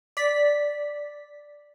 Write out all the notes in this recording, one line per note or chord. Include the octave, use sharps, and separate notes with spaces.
D5 B6